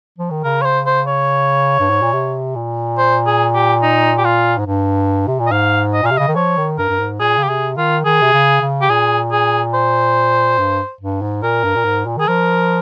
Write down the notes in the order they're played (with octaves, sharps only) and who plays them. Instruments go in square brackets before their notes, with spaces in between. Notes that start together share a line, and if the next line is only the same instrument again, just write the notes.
[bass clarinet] F3
D#3
[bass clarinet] C#3 [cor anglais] A#4
[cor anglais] C#5
C5
C5
C#5
[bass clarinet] G2
G#2
A#2
C3
A#2
[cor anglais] C5
G#4
G4
D#4
G4
F4
[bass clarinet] G#2
G2
C3
A#2
[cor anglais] D#5
[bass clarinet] G#2 [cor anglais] F5
[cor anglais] D#5
[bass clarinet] A#2 [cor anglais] F5
[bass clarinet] C3
[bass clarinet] C#3 [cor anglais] D#5
[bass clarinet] D#3
[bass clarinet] F3 [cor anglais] C#5
[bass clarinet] D#3
[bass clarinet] G2 [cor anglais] A#4
[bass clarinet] G2
G#2
[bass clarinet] A#2 [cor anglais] G#4
[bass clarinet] C#3
[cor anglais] G4
[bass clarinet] C3 [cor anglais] G#4
[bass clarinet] D#3 [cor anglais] F4
[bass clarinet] D#3 [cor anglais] G#4
[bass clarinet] C3
C#3
C#3
[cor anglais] G4
[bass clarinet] A#2 [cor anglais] G#4
[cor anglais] G#4
C5
[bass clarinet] G2
G2
G#2
[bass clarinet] A#2 [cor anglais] A#4
[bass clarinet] G2
A#2
G#2
A#2
[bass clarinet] D#3 [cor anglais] G#4
[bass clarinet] F3 [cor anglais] A#4